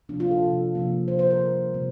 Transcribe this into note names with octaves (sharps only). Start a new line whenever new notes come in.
C3 F3 A#3 D4
F4
A4
C3 F3 A#3
C3 F3 A#3
C3 F3 A#3 C5
C5
A#4
C3 G3 A#3
C3 G3 A#3